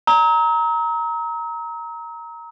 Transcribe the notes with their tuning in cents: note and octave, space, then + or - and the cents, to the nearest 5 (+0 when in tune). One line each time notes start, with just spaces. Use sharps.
A#5 +0 E6 -45